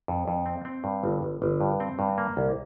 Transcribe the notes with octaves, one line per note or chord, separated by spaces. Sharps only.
F2
F2
C4
C4
G2
G1
G1
G1
G2
C4
G2
A#3
C2